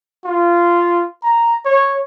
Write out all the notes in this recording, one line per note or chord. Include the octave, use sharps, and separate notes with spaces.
F4
A#5
C#5